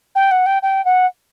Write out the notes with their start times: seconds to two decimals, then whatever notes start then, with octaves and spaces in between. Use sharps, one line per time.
0.15 G5
0.31 F#5
0.46 G5
0.63 G5
0.85 F#5